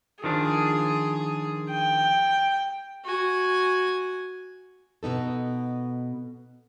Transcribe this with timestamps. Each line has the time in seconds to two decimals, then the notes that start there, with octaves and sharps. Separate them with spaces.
0.24 D#3 F3 D4 G#4
1.71 G5
3.04 F#4 G#5
5.03 B2 B3 D#4 A4